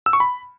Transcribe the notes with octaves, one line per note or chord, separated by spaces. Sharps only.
E6
C#6
B5